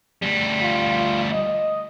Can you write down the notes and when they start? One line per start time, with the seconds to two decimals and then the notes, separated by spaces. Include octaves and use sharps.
0.22 D2 G3
0.62 F4
1.31 D#5